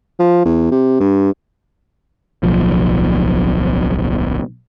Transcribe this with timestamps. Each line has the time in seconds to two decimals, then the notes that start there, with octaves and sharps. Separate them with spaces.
0.19 F3
0.45 E2
0.71 C3
1.00 G2
2.43 D1 B1 F3